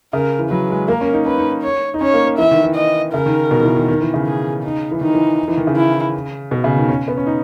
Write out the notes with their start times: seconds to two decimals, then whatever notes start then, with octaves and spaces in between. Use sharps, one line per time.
0.13 C#3 A#4
0.39 E3
0.50 F#3 B4
0.70 G#3
0.88 A#3 A#4
1.01 C#4
1.13 D#4
1.26 C#4 B4
1.38 D#4
1.63 C#5
1.94 D#4
2.01 C#4 C#5
2.14 A#3
2.38 E3 E5
2.51 D#3
2.64 E3
2.76 D#5
3.14 C#3 A#4
3.26 D#3
3.51 B2
3.60 D#3
3.64 E3
3.76 D#3
3.88 D#3
4.01 E3
4.14 C#3
4.27 G#4
4.64 D#4
4.91 E3
5.01 D#3 D#4
5.14 E3
5.48 E3
5.57 D#3
5.67 C#3
5.76 E4
6.51 B2
6.64 C#3
6.76 D#3
6.89 C#4
7.08 B3
7.17 C#4
7.26 D#4